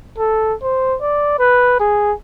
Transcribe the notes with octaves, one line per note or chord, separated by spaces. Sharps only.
A4
C5
D5
B4
G#4